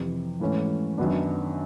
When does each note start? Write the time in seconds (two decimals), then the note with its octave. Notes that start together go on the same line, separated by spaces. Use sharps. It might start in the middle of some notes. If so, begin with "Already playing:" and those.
Already playing: F2 C3 E3
0.40 G#2 E3 A3 C#4
0.98 F#2 D#3 F#3 B3 D4